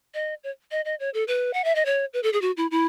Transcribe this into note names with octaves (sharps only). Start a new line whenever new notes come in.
D#5
C#5
D#5
D#5
C#5
A4
B4
F#5
E5
D#5
C#5
B4
A4
G#4
F#4
E4
E4